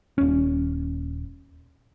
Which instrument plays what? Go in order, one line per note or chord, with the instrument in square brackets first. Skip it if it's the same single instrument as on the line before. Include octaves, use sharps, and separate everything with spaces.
[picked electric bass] D#1 C#4